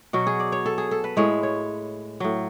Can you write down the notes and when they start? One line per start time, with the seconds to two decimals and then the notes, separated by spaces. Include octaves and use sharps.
0.13 B2 F#3 F#4
0.27 G#4
0.40 D5
0.52 C#5
0.66 A4
0.78 G#4
0.91 A4
1.04 B4
1.17 A2 G#3 C#5
1.43 C#5
2.20 A2 F#3